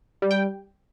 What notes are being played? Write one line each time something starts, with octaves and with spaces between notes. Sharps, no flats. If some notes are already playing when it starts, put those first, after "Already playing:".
G3
G5